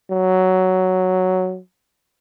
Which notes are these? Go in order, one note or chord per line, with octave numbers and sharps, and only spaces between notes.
F#3